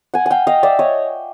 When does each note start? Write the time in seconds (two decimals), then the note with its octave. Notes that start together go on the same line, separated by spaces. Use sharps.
0.14 F#5 G#5
0.26 F5 G5 G#5
0.47 D#5 F5
0.63 D5 E5
0.79 C#5 D#5